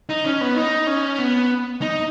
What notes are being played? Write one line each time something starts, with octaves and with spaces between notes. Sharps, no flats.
D#4
C#4
B3
D#4
C#4
B3
D#4